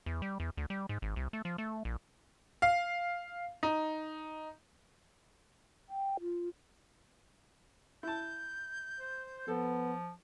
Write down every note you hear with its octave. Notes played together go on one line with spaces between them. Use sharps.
E2
G3
E2
D2
G3
G#2
G#1
C2
A3
F3
A3
A#1
F5
D#4
G5
F4
E4 A5 G6
C5
F3 B3 A4